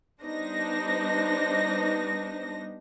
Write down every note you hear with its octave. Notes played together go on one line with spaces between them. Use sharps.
G3 B3 D4 D#4 C5 A#6